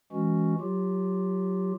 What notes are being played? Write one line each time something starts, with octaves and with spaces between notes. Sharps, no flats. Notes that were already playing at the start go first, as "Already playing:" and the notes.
E3 G#3 C#4 F#4
F#3 F4 G4